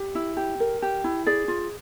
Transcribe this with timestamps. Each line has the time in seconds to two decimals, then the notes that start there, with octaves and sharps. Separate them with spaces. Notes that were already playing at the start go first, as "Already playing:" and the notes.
Already playing: G4
0.15 E4
0.37 G4
0.60 A#4
0.82 G4
1.04 E4
1.26 G#4 D5
1.48 F4